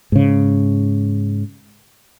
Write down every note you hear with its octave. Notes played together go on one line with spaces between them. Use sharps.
G#2 C#3